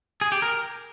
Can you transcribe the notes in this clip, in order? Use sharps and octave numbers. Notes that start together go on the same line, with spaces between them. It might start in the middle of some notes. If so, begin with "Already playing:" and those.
G#4
G4
A#4